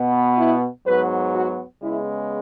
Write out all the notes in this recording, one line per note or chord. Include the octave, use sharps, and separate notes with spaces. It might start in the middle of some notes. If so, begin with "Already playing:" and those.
Already playing: B2 B3
E4
G#2 F#3 B3 B4
F#4
C#3 G#3 B3 E4